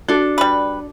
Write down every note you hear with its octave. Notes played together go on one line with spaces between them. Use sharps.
D4 F#4 A4
G3 B4